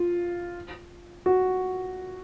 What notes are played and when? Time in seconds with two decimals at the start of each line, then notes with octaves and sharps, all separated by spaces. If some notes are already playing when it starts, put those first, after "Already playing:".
Already playing: F4
1.26 F#4